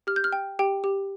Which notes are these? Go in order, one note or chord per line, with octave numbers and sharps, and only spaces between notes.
G4 F6
G6
F6
G5
G4 G5
G4